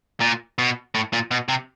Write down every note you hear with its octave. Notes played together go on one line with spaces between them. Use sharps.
A#2
B2
A2
A#2
B2
C3